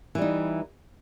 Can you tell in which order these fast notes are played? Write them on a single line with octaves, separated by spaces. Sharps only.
E3 G3 D#4